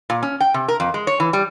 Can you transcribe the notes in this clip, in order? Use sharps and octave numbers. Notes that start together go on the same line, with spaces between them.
A#2
C#4
G5
C3
A#4
F2
G#3
C#5
E3
G3